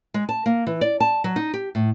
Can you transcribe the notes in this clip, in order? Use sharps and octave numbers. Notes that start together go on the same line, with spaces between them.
G#3
A5
A#3
E3
D5
A5
F#3
D#4
G4
A2